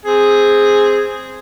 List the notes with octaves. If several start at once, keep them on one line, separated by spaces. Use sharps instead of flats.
C4 G#4